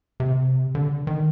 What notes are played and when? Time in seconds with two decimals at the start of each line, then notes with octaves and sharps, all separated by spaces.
0.20 C3
0.75 D3
1.07 D#3